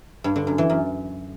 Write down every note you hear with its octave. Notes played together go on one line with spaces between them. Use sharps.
G2
D3
F#2
E3
F#2